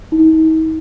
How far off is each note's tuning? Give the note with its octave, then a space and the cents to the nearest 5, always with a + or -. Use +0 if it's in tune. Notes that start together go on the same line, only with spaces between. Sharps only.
D#4 +40